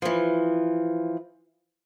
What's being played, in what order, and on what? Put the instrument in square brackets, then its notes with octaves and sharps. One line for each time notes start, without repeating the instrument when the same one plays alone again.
[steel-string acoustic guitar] E3 F3